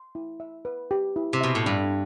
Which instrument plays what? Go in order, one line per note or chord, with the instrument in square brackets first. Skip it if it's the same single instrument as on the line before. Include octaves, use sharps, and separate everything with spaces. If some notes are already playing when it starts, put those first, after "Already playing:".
Already playing: [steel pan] C6
E4
E5
B4
G4
E4
[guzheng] C3
[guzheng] B2 [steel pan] E5
[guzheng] A2
[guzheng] G2 [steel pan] D4